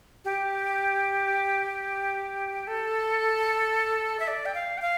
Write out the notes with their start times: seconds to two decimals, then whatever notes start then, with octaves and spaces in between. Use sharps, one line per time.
0.25 G4
2.67 A4
4.20 E5
4.28 D5
4.46 G5
4.54 F5
4.78 G5
4.82 F5